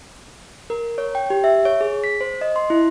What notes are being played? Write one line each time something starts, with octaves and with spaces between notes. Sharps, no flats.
A#4
C#5
G5
G4
E5
C#5
G#4
B6
C5
D#5
C6
E4